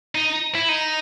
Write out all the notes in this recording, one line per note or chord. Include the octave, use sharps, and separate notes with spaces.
D#4
E4
D#4